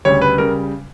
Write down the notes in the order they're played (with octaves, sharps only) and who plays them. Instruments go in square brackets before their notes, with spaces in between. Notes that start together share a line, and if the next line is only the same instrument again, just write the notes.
[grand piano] D2 C#3 G3 C#5
B4
C#3 G3 A#4